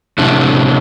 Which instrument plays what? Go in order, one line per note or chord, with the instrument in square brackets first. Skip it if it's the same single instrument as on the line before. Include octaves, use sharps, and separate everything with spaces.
[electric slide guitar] A2 C3 D4